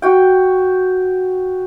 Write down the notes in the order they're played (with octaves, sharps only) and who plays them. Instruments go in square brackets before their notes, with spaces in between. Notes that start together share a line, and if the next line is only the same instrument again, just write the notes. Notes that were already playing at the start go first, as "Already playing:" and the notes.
[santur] F#4 G5